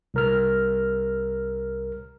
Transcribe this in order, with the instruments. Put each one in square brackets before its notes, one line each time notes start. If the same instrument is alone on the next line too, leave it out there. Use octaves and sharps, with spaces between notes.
[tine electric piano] C2 A#4 F6